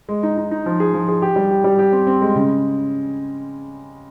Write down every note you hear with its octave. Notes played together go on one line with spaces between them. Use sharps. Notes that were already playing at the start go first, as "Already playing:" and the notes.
G#3
D#4
D#4
D#4
F3
G#4
F3
G#4
G4
G3
G4
G3
G4
C4
C4
G#3
C#3